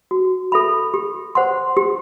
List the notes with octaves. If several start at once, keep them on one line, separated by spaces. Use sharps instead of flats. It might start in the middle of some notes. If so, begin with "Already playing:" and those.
F#4
A4 E5 B5
G4
C5 F#5 C6
G4